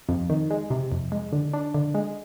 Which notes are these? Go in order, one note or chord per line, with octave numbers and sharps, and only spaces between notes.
F2
D#3
G#3
C3
F2
G#3
D3
D4
D3
G#3